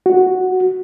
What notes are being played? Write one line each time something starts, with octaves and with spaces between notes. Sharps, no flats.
F#4